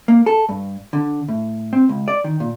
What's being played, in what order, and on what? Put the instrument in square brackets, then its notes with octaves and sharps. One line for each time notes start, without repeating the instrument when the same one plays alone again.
[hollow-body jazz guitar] A#3
A4
G2
D3
A2
C4
C#2
D5
D#3
A#2